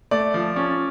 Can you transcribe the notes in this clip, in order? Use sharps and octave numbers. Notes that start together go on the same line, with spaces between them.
A3 D5
F3
C#4